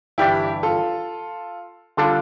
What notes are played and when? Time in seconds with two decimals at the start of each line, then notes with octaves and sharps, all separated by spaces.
0.18 G1 G2 E3 G3 D4 E4 G4
0.63 F4 A4
1.97 D3 G3 D4 F4 A4